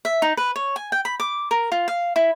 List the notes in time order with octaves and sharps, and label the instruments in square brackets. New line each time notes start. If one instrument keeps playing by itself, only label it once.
[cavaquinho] E5
D#4
B4
C#5
G#5
G5
B5
D6
A#4
F4
F5
E4